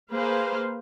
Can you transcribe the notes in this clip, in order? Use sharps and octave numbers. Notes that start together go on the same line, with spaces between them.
A#3 G#4 B4 C5 F5